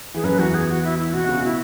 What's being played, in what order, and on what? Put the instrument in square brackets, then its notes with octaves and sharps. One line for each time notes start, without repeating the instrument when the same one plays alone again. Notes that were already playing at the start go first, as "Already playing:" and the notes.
[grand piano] E3 [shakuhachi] G#4
[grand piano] F#2 F#3 [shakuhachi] B4
[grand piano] E2 E3 [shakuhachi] F#4
[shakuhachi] G#4
F#4
E4
E4
[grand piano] B2 [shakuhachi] F#4
[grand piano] C#3
[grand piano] B2 [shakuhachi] E4